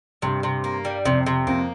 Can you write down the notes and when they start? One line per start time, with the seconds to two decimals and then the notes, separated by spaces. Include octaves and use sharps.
0.22 G2 C3
0.43 C3
0.64 A#3
0.85 G3
1.05 F2 C3
1.26 C3
1.47 F2 A#3